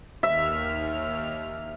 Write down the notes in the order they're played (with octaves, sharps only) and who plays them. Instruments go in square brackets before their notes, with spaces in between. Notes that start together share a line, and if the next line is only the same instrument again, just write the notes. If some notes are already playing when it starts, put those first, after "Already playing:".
[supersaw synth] D#2 F6 [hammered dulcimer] E5